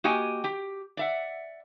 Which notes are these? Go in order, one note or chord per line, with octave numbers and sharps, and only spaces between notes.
A#3 F#4 G4 D#5 G5 G#5
G4 G5
D5 E5 F#5